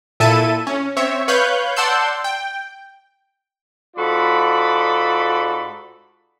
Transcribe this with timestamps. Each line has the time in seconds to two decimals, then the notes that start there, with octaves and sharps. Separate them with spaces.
0.20 A#2 E4 A4 E5 A5 D#7
0.67 C#4
0.97 C4 C#5 E5
1.28 B4 C#5 F5 F#6 G6
1.76 D5 F#5 A5 C6 E6 G6
2.24 G5
3.97 G#2 F4 F#4 A4 D5 B5